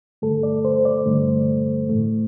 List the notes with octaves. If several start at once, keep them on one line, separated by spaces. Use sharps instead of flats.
G2 D3 A3 A4
D5
C5
D5
G2 D3 A3
A2 E3 A3